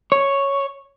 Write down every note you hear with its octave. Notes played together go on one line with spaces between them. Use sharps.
C#5